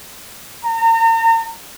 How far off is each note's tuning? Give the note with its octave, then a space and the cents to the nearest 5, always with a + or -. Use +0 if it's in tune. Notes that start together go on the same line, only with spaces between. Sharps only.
A#5 -40